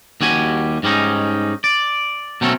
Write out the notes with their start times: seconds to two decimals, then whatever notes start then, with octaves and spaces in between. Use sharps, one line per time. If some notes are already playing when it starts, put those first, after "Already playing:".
0.21 D#2 G3 F#4 G#5
0.83 G#2 G3 C#4 D#4
1.64 D5
2.41 B2 F#3 A3 C4 C#4 A4